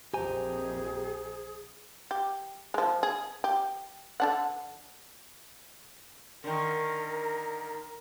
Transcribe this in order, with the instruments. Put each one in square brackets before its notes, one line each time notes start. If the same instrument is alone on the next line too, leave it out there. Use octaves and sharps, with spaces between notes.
[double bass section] A#1 F2 [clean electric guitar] G4 G#5 [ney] G#4 [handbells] C5 A#5
[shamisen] G4
F3 G#3
G#4
G4
D3 D4 F#5
[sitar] D3 D#3 [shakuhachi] A#4